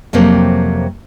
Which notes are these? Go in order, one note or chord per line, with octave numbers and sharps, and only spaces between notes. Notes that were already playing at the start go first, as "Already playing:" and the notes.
F2 C3 F#3 A#3 C4